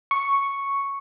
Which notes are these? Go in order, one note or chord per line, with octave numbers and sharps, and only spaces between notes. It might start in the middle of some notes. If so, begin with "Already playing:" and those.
C#6